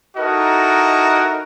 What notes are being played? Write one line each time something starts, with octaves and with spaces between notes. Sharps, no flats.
D#4 E4 F#4 A4 A#4 D#5